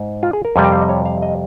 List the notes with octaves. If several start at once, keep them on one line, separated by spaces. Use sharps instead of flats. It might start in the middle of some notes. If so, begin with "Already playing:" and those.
Already playing: G#2
F4
G#4
A#4
F2 C3 G3 G#5
G5
F5
D#5
C#5
F5
D#5